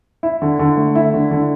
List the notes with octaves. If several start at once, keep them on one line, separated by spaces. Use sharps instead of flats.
E4
D3
D3
A3
E4
D3
D3